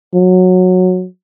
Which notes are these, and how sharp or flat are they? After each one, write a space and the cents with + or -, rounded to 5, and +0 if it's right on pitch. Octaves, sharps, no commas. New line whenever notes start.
F#3 -15